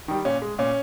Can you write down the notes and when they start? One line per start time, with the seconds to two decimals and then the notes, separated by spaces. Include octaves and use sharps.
0.08 D#3 G3
0.25 A#2 C#4
0.42 G#3
0.58 A#2 C#4